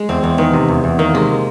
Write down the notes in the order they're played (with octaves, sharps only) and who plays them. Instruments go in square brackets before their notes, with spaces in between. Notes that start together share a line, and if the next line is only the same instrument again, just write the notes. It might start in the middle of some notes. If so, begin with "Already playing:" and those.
Already playing: [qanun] G#3
[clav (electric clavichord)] E2 [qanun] C4
[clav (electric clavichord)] E2 [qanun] C4
[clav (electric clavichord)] D#3 [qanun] B3
[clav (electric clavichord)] C3
E2
E2
[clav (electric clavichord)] D#3 [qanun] A#3
[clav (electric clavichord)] C3 [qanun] G#3